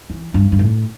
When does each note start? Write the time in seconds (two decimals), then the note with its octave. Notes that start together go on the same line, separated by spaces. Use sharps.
0.10 E3
0.34 G2
0.52 G2
0.59 A2